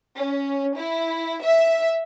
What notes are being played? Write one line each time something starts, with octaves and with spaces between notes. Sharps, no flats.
C#4
E4
E5